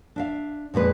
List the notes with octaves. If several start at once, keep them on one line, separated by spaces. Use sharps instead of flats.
D4 E5 F5
F2 A#2 G#3 B4